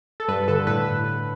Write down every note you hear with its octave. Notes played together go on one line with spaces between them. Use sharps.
A4
G2 B4
D3 A4
A2 B4